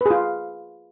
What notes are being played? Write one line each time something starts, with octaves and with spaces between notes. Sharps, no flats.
F4 G#4 B4